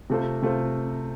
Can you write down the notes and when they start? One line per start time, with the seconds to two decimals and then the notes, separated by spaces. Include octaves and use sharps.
0.10 C3 A3 F4 C5
0.42 C3 A3 F4 C5